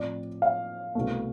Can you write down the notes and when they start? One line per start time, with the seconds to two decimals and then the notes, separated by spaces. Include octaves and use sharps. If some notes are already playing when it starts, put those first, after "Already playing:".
Already playing: A2 F3 C4 E4 D5
0.42 F5
0.95 C2 B2 A3